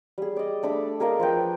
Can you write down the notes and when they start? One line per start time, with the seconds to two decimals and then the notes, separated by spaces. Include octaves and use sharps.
0.18 G3 G#4
0.36 D5 D#5
0.63 A3 D4 B5
1.00 G#4 A#4 D#5 F5
1.20 F3 B4 G5